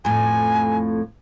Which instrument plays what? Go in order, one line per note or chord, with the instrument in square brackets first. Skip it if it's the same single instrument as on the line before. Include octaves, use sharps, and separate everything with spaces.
[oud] F2 A2 [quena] G#5